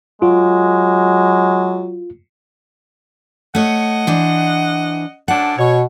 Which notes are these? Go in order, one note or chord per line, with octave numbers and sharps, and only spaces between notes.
F#3 G#3 F4
A3 C#5 D#5 F#5
E3 D4 C5
F#2 D4 F#5
B2 C#5